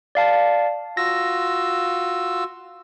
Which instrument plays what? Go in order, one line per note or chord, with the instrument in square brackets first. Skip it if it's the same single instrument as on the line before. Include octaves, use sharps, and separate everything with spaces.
[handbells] D5 F5 A5
[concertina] F4 F#4 E6 [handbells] A#6